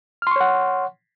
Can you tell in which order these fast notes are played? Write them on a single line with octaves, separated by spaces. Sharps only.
F6 C6 C#6 C#5 F#5